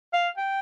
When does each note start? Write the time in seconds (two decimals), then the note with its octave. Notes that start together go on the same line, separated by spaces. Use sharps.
0.13 F5
0.37 G5